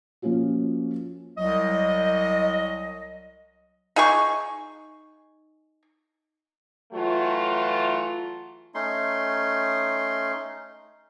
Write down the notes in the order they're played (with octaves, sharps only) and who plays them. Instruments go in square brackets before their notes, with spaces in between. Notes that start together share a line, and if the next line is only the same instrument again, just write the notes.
[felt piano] F3 A#3 C#4 F4 F#4
[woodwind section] C2 F#3 D#5
[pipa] D#4 G#4 G#5 C#6
[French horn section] E3 F#3 A3 F4
[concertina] A3 C#4 D#4 C6